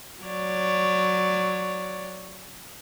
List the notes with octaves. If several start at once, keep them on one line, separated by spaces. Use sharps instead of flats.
F#3 C#5 D5